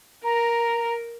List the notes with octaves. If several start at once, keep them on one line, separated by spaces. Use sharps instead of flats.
A#4 A#5